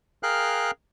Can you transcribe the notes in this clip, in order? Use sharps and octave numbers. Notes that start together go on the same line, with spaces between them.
G#4 A#4 F5 G5 F6 F#6